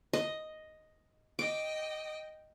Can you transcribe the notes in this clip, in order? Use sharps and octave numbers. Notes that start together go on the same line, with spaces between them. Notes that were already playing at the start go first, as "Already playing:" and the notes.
D#5
D#5 G5 D6